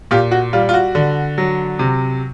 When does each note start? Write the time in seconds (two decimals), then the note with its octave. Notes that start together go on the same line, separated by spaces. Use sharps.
0.11 A#2 F4 G4
0.31 F#4
0.53 G3 F4
0.69 F4
0.74 F#4
0.95 D3
1.38 F#3
1.79 C3